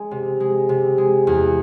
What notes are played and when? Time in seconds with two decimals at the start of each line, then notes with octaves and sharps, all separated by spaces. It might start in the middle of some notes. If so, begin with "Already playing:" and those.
Already playing: G#3
0.11 C3
0.40 G#3
0.69 C3
0.98 G#3
1.27 E2